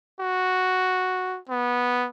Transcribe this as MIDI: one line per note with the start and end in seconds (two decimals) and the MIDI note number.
0.20 1.38 66
1.49 2.08 59